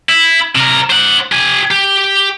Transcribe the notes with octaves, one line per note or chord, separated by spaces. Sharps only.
E4
C3 A#4
C5 F#5
G4 G#5
G4